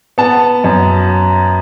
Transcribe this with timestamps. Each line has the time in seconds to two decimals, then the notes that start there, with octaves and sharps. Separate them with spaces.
0.18 B3 A5
0.64 F#2